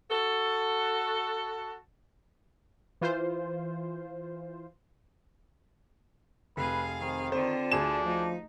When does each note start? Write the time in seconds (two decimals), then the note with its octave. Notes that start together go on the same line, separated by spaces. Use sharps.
0.10 F#4 A4
3.01 E3 F4 C5
6.57 F1 G#4 B4 F5
7.01 D#3 C4
7.32 D3 C4 F4 C5
7.72 D2 D4 G#4 E7
8.04 F3 A3 D#4